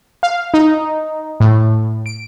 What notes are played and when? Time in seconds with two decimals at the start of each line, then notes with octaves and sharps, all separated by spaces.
0.23 F5
0.54 D#4
1.40 A2
2.06 D7